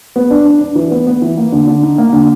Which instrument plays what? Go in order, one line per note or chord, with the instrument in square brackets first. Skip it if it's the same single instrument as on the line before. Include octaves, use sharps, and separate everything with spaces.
[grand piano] B3
D4
D4
D4
E3
B3
B3
E3
A#3
D3
D3
D#4
A#3
D3